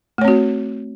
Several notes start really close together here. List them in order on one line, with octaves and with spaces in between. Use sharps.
A3 C#5 C4 F#4